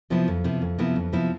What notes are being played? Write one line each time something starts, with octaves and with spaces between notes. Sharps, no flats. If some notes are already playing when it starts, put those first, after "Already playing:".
C3 F3 B3 E4
F2
C3 F3 B3 E4
F2
C3 F3 B3 E4
F2
C3 F3 B3 E4